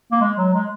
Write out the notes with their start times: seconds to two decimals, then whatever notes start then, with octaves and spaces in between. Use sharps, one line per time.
0.12 A#3
0.21 G#3
0.37 F#3
0.54 G#3